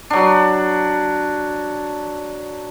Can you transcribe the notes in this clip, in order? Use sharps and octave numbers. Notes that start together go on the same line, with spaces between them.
F#3 D4